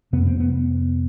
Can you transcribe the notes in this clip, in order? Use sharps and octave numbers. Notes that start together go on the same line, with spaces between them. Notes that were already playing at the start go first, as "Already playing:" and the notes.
F2 C3 B3
C4
B3